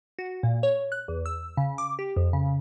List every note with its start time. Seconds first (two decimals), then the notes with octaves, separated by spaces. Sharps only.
0.19 F#4
0.43 A#2
0.63 C#5
0.92 F#6
1.08 E2
1.26 E6
1.57 C#3
1.78 D6
1.99 G4
2.16 F2
2.33 C#3